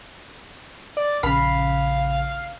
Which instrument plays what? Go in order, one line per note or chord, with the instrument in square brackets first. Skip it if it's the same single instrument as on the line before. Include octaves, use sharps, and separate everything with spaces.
[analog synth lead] D5
[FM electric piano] A#1 C#3 [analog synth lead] F5 [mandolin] B5